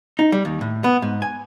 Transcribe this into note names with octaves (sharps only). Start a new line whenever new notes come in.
D#4
G3
D#2
A2
B3
G#2
G#5